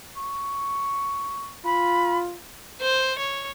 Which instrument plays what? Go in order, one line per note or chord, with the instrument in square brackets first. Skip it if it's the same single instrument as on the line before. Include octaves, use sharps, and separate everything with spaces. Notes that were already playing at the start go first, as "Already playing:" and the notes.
[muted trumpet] C#6
[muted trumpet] F4 [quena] B5
[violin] C5
C#5